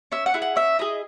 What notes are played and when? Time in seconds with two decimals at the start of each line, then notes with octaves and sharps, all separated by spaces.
0.12 C#4 E5
0.26 F#5
0.34 E4 G#4
0.42 F#5
0.56 C#4 E5
0.79 E4 G#4 D#5